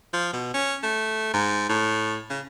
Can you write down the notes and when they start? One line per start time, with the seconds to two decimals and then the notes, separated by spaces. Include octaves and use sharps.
0.13 F3
0.33 B2
0.54 C#4
0.83 A3
1.34 G#2
1.69 A2
2.30 C#3